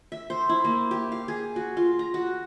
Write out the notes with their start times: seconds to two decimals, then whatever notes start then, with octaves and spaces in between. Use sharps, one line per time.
0.12 E5
0.30 C5
0.49 E4
0.65 A#3
0.91 G4
1.12 F5
1.28 G#4
1.56 F#4
1.77 F4
1.99 A#5
2.14 F#4